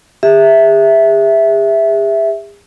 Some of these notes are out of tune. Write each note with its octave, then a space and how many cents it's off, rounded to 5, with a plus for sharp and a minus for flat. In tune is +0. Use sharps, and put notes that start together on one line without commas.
G#4 -45 E5 +0